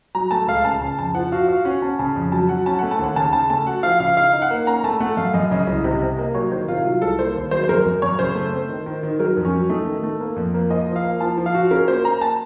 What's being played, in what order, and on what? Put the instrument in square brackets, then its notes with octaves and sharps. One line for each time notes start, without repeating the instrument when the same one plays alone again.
[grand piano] F#3 [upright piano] A#5
[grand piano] A3 [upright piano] A5
[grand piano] C#2 [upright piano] F5
[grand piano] C#3 [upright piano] A5
[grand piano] C#3 [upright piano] A5
[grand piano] F2 [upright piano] A5
[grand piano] F3 [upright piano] F#5
[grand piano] F#4 [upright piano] F5
[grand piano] F#4 [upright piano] F5
[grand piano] C#4 [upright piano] F#5
[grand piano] C#4 [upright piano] A5
[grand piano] C#3 [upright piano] A5
[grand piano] F2
[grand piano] F#3 [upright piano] A5
[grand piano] F#3 [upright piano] F#5
[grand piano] C#4 [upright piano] A5
[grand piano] A3 [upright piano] F#5
[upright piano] A5
[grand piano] D#2 [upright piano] F#5
[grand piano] C#3 [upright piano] A5
[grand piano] C#3 [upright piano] A5
[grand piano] A3 [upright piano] A5
[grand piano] F#4 [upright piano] F#5
[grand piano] F3 [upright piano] F5
[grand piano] C#3 [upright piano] F5
[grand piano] D#4 [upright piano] F5
[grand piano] D#4
[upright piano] F#5
[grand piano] A#3
[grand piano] C#4 [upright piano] A#5
[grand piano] A3 [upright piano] A5
[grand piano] A3 [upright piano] F#5
[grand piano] F#2 [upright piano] F5
[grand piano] F#2 [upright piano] D#5
[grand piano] C#3 [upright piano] D#5
[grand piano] C2
C3
C3
[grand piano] A#3 [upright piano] D#5
[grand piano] F#3 [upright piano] C#5
[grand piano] D#3 [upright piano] C5
[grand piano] C3 [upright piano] F4
[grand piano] F#3 [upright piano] F4
[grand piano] C2 [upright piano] A4
[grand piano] A#3 [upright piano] C5
[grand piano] D#2
[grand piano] F#3 [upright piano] C5
[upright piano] C5
[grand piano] F#2 [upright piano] A#4
[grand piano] F#2
[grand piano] F#2 [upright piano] C#5
[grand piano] C#3 [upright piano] C5
[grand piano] A3
C4
D#3
D#3
D#3
[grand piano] F#3 [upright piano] A#4
[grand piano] F2
[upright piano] C#4
[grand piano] F#3
[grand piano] A3 [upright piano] D#4
[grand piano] D#3
A3
A#3
F2
A#3
[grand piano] F3 [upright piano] D#5
[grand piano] F3
[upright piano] F5
[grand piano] A#3
[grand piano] F3 [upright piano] A5
[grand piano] F3
[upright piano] F5
[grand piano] F#4
[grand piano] C#4 [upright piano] A#4
[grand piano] A#3 [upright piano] C5
[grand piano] A#3 [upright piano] A#5
[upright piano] A5